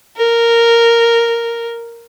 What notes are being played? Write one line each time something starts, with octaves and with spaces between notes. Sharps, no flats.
A#4